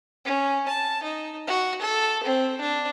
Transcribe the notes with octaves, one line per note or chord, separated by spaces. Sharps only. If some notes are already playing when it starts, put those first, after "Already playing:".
C#4
A5
D#4
F#4
A4
C4
D4